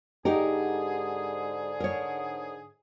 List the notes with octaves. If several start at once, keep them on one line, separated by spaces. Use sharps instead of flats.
G#2 D3 D#4 G4 G#4 A#4
A#4 C#5